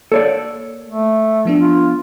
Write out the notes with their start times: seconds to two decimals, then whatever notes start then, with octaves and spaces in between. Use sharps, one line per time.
0.12 A#3 A4 C#5 D5
0.87 A3
1.45 F3 B3 D4
1.60 F4